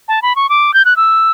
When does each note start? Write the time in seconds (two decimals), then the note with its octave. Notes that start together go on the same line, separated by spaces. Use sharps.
0.08 A5
0.22 B5
0.36 C#6
0.49 D6
0.74 G6
0.85 F#6
0.97 E6